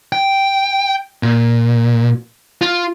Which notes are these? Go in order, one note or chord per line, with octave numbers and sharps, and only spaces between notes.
G5
A#2
F4